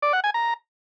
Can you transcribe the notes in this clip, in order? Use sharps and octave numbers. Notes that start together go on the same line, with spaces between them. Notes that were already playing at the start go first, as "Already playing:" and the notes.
D5
F#5
G#5
A#5